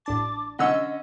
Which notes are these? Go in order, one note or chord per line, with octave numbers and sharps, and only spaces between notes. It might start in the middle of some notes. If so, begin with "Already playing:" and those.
A1 D4 A5 D6
D3 C#4 D#5 F#5 E6